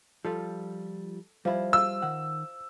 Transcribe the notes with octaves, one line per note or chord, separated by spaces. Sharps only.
F3 G3 F4 A4
F3 G3 E4
F4 E6
D#3 F#5